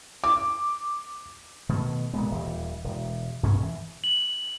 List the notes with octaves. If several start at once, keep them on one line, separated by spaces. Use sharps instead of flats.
D6
B2 D#3 A3
F1 A#2 G#3 B3
D#1 E3 G3
E1
G2 B2 C#4
E3
F#7